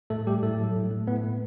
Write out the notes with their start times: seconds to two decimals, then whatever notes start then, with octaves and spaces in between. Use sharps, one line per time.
0.10 A2 A3 A4
0.27 G3 A3 G4
0.43 A2 A3 A4
0.59 F#3
0.75 A2
0.91 A3
1.07 A2 B3 B4
1.24 A3